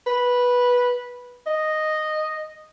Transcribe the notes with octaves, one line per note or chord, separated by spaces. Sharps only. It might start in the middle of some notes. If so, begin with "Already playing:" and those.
B4
D#5